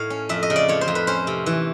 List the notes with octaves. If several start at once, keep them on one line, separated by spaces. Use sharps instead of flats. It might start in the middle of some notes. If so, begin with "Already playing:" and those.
Already playing: A2 C#5 F5
C#4
F2 E5
D#5
C#3
D5
F3 C#5
C5
F2
B4
C#4 C5
C3
E3